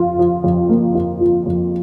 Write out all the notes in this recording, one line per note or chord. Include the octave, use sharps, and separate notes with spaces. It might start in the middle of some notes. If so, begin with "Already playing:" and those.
Already playing: F2 F4
F3
F2
A#3
F4
F3
F2